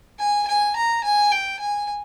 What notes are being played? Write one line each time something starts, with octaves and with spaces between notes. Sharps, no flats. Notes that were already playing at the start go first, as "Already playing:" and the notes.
G#5
G#5
A#5
G#5
G5
G#5